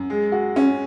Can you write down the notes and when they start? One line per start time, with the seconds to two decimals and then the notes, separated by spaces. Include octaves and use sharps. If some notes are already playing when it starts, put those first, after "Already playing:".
Already playing: F#2
0.10 G#3
0.32 F#4
0.56 C#4